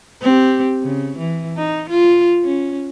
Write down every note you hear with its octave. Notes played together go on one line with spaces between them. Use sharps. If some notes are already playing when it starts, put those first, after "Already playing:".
C4 G4
C#3
E3
D#4
F4
C#4